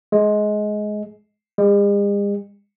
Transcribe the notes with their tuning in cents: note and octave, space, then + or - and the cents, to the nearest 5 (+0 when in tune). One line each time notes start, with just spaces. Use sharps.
G#3 +20
G#3 -45